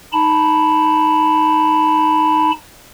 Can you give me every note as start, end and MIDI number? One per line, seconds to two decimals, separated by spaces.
0.13 2.51 63
0.13 2.51 81
0.13 2.51 83